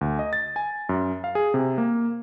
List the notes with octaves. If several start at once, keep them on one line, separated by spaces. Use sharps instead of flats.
D2
D#5
A6
G#5
F#2
F5
G#4
C3
A#3